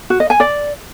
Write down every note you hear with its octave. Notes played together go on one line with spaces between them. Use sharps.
F#4
D#5
G#5
D5